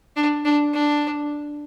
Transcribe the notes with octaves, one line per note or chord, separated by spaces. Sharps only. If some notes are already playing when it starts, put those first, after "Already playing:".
D4
D4
D4